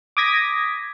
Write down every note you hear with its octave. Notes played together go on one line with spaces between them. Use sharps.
D6 D#6 G#6 A#6 B6